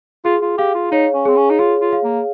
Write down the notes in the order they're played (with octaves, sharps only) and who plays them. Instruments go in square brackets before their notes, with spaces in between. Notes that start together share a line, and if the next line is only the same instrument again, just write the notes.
[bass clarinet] F4 [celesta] G#4
[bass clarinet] F4
[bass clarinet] G4 [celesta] F5
[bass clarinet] F4
[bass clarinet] D#4 [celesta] C#5
[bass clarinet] C#4
[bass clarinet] C4 [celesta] G#4
[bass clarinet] C#4
D#4
[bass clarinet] F4 [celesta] G#4
[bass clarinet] F4
[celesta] F5
[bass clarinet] A#3